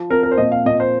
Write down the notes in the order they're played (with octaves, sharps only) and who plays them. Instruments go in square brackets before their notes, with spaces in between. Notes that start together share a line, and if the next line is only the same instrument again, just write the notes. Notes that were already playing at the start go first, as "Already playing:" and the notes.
Already playing: [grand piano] F3
[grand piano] C4 [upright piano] A#4
[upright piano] A#4
C5
[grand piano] A#2 [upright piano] D#5
[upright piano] F5
[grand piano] A#2 [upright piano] D#5
[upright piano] C5